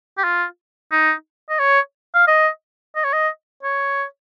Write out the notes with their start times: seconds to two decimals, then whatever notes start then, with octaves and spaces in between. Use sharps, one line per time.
0.18 G4
0.24 F4
0.92 D#4
1.50 D#5
1.59 C#5
2.15 F5
2.28 D#5
2.96 D#5
3.04 C#5
3.13 D#5
3.63 C#5